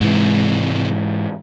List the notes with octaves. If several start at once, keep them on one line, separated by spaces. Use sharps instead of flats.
G#2 C3 E3 G#3